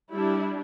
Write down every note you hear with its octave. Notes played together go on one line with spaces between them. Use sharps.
G3 D4 E4